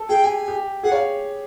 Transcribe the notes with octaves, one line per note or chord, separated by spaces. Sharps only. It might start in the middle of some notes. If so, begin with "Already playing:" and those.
Already playing: A4
G#4 G5
G4 G#5
G4
G#4 F#5
C#5 F5